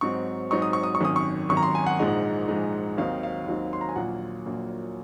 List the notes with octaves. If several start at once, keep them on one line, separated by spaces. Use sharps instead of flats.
G#2 F#3 C4 D#4 C#6
G#2 F#3 C4 D#4 C#6
D#6
C#6
D#6
C#6
G#1 F#2 D#3 D#6
C#6
G#1 F#2 D#3 C#6
A#5
C6
G#5
F#5
A#1 G#2 F3 G#3 D#4
A#1 G#2 F3 G#3 D#4
D#2 D#3 F#3 C4 D#4 F5
F5
D#2 D#3 F#3 C4 D#4
C6
A#5
G#5
A#1 A#2 F#3 A#3 F#5
A#1 A#2 F#3 A#3